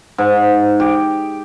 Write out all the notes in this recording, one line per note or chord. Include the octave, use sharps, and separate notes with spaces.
G#2
G4